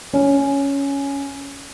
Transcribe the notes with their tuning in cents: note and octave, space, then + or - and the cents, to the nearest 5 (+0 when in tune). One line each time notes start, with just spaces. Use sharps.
C#4 +5